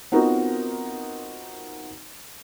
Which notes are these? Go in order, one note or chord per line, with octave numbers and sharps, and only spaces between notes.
B3 C4 D#4 F4 F#4 A#4